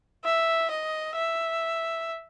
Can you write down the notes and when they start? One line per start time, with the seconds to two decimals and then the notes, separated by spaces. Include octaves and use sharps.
0.25 E5
0.71 D#5
1.16 E5